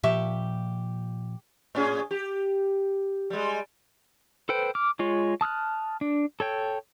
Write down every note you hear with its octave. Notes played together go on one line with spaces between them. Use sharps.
A#2 F3 G4 E5 C#6
A2 C#4 G#4
G4
G3 G#3
A4 B4 C5 G5
D6 F6
G#3 F4 C#5
A5 D#6 F6 F#6
D4
A4 C#5 G5